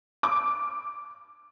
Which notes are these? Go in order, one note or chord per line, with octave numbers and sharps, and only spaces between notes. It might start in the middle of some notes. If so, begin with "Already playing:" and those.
D6